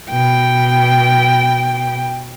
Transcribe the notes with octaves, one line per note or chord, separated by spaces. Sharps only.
B2 G5